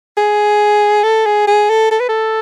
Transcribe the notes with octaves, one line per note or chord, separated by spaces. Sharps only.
G#4
A4
G#4
G#4
A4
A4
B4
A4